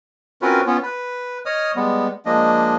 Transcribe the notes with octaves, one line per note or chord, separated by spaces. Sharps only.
C4 C#4 F4 F#4 A#4 B4
B3 C#4 F4
B4
C#5 D#5 D#6 F6
G3 G#3 B3
F3 G#3 A#3 D4 D#5